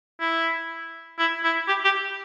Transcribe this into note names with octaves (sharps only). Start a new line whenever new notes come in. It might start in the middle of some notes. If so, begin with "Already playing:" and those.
E4
E4
E4
G4
G4